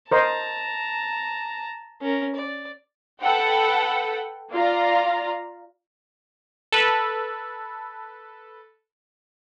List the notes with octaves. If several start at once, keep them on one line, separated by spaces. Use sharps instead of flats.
A#4 C5 D#5 A5 A#5
C#4 A#4
D5
A4 B4 F#5 G5
F4 D5 F5 A#5
A4 B4